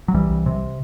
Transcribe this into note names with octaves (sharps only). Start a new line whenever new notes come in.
F#3
C2 E3 G3
C2
C3